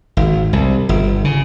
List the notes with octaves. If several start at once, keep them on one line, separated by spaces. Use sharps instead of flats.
G#1
C2
G1
C#3